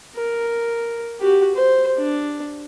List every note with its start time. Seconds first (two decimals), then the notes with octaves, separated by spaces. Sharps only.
0.16 A#4
1.20 F#4 G4
1.55 C5
1.97 D4